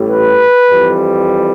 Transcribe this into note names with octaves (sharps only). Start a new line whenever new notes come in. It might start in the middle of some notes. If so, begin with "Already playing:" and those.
Already playing: A1 A2 G3
B4
F2 E3 G3